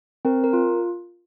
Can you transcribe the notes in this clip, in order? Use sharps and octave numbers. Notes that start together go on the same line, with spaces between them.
C4 A#4
A#4
F4